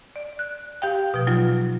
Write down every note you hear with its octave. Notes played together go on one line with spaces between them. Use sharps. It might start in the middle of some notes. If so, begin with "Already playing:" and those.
D5
F#6
G4 F5 G5
B2 F3
F#3 D#4 F4